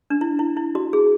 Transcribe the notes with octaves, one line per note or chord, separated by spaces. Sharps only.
D4
E4
E4
E4
F#4
G#4